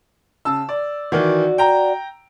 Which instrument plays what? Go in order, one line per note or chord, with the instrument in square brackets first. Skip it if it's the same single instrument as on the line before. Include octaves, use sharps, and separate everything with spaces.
[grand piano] C#3 A5 E6
D5
[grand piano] D#3 E3 [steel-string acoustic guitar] F#4 D5
[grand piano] G5 A#5